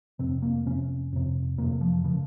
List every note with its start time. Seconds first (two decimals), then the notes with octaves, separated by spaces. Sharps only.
0.19 F2 C3 C4
0.42 A#3
0.66 F2 C3 C#4
1.13 F2 C3
1.58 F2 C3 A#3
1.81 F3
2.04 C#3 F3